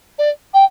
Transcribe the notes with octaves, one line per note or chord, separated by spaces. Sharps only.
D5
G5